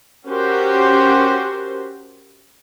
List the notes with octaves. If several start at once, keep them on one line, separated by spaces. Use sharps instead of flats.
C#4 F#4 G4 A#4 C5